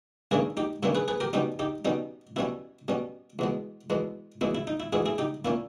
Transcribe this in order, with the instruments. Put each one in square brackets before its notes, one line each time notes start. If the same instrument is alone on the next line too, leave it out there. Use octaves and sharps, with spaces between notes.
[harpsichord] G2 D#3 A#3 C#4 E4 G#4
D#4 G4
G2 D#3 A#3 C#4 E4
G#4 B4
G#4 B4
G4 A#4
B2 G3 C#4 D#4 G4
D#4 G4
B2 G3 C#4 D#4
B2 G3 C#4 E4
B2 G3 C#4
E2 B2 G#3
E2 B2 G#3
E2 B2 G#3 E4
E4
D#4
E4
E2 B2 G#3 E4 G#4
E4 G#4
D#4 G4
A#2 A#3 C#4 E4